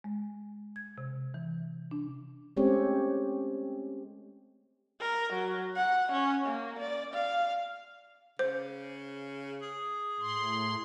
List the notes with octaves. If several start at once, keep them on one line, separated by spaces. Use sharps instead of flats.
G#3
G#6
C3
E3
D4
G#3 A3 C4 C#4 G4 C#5
A#4
F#3
F#5
C#4
A#3
D5
F5
C#3 C5
G#4
A2 C6